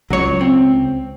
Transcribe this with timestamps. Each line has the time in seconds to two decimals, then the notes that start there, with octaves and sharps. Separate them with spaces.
0.10 C#2 F#3 C#5
0.41 C4